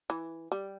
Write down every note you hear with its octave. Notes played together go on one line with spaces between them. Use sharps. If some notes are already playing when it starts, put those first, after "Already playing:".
E3
G3